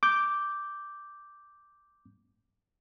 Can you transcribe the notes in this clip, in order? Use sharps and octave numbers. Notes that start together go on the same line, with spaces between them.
D6 G6